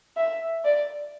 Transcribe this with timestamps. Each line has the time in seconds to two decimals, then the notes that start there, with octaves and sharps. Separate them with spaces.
0.17 E5
0.65 D5